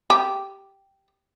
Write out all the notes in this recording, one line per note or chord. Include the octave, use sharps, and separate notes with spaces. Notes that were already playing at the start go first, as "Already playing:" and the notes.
G4